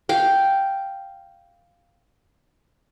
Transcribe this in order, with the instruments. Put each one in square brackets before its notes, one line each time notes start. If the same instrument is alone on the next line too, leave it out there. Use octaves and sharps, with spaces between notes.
[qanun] F5 G5